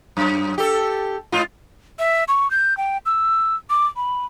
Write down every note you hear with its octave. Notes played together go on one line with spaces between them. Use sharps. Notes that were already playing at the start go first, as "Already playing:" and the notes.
F#2
G4 A4
G#2 F4
E5
C#6
G6
G5
E6
D6
B5